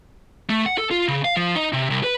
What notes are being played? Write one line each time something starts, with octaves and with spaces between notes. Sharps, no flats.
A3
F#5
A4
F4
C#3
F5
F3
D#4
C3
C2
B4